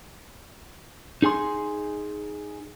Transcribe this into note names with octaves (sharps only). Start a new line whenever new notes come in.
D#4 G#4 G#5 C6